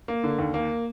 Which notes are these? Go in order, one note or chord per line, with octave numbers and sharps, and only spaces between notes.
A#3
D3
D#2
A#3